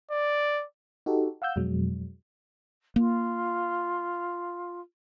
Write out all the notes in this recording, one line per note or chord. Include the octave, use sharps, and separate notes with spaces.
D5
D#4 F#4 G4 A4
F5 F#5 E6 G6
F2 B2 F#3 G#3
A#3 F4